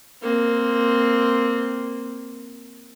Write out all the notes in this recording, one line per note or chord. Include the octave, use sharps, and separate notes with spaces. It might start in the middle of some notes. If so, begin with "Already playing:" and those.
A#3 C4